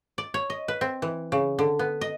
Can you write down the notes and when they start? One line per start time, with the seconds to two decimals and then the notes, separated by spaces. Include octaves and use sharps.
0.18 D5
0.34 C#5
0.50 D#5
0.68 B4
0.81 C4
1.02 E3
1.32 C#3
1.59 D3
1.79 B3
2.01 D#5